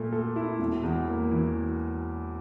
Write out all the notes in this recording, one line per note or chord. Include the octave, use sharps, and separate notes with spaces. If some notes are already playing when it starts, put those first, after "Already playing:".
Already playing: A#2 A3
A4
E4
E1
E2
A#3
E3